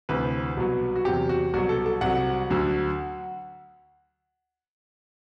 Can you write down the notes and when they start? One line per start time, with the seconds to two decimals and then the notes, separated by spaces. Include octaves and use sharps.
0.09 D2 C3 E3 B4
0.57 C2 B2 F#3
0.96 F#4
1.05 E2 C3 F#3 G4
1.29 F#4
1.54 C2 B2 F#3 F#4
1.69 A4
1.86 A4
2.01 C2 C3 F#3 F#5
2.50 D2 D3 F#3